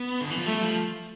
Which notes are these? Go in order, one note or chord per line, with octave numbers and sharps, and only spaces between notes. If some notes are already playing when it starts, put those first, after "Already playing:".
Already playing: B3
D3
E3
F3
G3 A3
F3